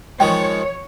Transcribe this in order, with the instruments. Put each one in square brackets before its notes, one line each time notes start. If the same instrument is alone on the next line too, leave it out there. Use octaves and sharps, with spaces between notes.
[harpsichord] D#3 F3 G#3 [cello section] C#5 [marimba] G5